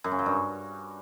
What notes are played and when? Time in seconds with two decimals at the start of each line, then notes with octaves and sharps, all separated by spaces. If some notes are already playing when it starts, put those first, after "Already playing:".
0.04 F#2
0.12 C#3
0.19 F#3
0.26 G2